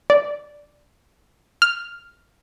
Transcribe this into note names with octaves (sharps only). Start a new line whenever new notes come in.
D5
F6